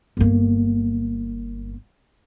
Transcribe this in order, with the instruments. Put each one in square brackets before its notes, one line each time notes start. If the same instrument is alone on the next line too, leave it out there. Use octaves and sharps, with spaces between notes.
[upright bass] G1 A#3